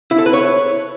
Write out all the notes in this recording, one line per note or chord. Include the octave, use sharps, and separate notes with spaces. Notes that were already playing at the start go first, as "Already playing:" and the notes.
E4
A4
B4
C#5